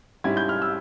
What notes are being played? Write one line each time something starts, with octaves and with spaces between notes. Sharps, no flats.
G#2 G3 C#4 E4 G#6
G6
F6
E6